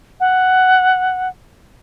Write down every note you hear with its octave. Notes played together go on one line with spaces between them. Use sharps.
F#5